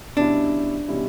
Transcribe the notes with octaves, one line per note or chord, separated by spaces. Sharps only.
B2 G3 C#4 D4 E4
B2 G3 C#4 E4